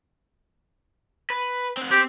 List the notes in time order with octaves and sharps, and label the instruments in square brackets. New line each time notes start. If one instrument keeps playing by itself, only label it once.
[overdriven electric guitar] B4
C4 F#5
[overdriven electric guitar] C4 [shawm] G4